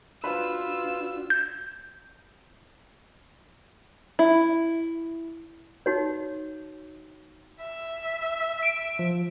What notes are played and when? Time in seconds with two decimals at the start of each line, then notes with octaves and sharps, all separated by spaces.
0.24 D4 F4 F#4 B4 C5 B5 E6
1.30 G6
4.19 E4
5.86 D#4 F#4 C#5
7.61 E5
8.62 D7
8.99 F3